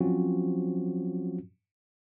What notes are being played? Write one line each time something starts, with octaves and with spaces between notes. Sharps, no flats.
F3 F#3 C4 C#4 F4 F#4